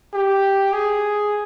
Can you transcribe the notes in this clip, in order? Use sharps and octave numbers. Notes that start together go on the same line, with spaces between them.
G4
G#4